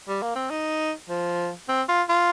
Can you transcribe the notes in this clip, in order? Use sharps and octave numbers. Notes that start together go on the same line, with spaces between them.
G3
A#3
C4
D#4
F3
C4
F4
F4